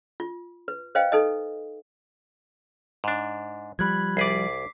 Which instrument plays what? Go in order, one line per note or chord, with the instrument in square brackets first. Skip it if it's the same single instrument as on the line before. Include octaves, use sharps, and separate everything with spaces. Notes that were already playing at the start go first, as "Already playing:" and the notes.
[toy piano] F4
B4
B4 C5 D#5 F5 G5
D#4 A4 B4 D#5
[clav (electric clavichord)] G#2 D4
[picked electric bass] F3 G3 [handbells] B5 F#6 G#6
[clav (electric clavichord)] C2 G#4 D5 [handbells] D6 B6 C7